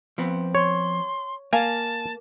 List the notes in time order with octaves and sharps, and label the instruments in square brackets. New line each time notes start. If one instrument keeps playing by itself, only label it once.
[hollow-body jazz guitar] F3 B3 C4
[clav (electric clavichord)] C#5 [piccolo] C6
[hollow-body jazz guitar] A#3 [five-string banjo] F5 G#5 [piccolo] A5